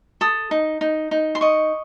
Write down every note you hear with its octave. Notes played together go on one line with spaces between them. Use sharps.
A4 D#6
D#4
D#4
D#4
C6
D#5 C#6